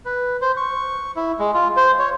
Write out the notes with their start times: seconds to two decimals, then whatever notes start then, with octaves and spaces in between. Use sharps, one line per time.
0.05 B4
0.41 C5
0.57 C#6
1.16 E4
1.39 G#3
1.54 F4
1.77 C5
1.99 C#5